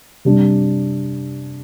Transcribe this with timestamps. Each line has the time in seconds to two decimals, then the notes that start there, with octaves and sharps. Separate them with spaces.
0.25 C3 G3 D4